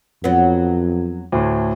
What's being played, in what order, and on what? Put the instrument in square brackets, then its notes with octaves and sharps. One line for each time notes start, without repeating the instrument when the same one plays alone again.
[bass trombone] F2 [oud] F#3 B3
[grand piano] D2 A2